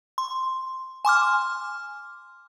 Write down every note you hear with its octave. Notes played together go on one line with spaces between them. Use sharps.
C6
G#5 C6 D6 F6